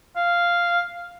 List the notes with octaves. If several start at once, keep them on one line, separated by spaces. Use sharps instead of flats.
F5